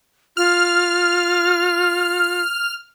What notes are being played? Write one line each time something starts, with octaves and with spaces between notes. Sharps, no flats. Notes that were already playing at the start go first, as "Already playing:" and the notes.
F4 F6